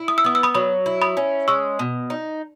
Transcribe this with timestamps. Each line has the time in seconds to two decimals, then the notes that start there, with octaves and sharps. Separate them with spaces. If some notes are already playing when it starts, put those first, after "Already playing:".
Already playing: E4
0.08 D#6
0.18 E6
0.25 B3 D#6
0.35 E6
0.43 B5 D#6
0.55 F#3 B5 D#6
0.86 E4
1.02 B5 D#6
1.17 C#4
1.48 G#3 C#6 E6
1.79 B2
2.10 D#4